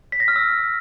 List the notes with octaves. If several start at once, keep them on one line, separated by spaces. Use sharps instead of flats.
B6
A#6
F6
E6